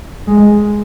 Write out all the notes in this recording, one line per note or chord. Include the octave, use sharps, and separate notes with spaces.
G#3